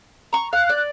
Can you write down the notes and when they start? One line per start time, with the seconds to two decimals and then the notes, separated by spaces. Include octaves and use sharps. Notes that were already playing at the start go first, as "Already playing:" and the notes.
0.33 A#5 C#6
0.53 F5 F#6
0.70 D5